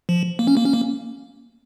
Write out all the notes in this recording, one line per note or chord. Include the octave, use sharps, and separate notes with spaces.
F3
A#3
C#4
A#3
C#4
A#3